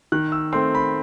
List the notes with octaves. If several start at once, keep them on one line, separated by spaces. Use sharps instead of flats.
D#3 F#6
E6
A3 C4 C6
B5